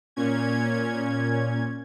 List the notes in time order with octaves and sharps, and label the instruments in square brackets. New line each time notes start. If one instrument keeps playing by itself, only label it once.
[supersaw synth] A#2 C#4 G#6